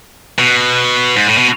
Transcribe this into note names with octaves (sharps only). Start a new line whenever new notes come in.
B2
G#2
A2
B2